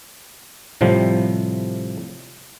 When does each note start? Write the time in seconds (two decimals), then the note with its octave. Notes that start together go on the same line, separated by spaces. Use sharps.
0.81 A2 C3 F3 G3